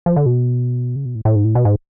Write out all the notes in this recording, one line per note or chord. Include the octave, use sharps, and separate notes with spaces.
F3
D3
B2
C#3
B2
A2
A2
G#2
A2
B2
G#2